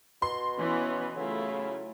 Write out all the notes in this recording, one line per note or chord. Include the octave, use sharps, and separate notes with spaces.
B2 C6
E3 B3 C#4
C#3 F#3 A3 E4 F4